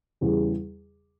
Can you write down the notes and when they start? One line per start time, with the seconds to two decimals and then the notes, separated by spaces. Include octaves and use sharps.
0.21 E2 C#3 G3